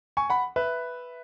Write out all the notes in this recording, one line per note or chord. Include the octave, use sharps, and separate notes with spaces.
G#5 C#6
F#5 B5
B4 E5